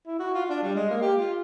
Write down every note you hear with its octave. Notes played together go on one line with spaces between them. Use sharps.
E4
F#4
F4
D4
G3
G#3
A#3
G4
F4